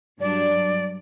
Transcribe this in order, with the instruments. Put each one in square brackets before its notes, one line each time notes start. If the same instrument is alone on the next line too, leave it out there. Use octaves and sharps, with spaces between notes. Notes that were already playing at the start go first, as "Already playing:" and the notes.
[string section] G2 F#3 D4 [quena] D5